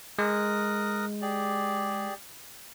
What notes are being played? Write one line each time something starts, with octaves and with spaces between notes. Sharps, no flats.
G#3 A#4 D#6 F#6
G4 G#4 D5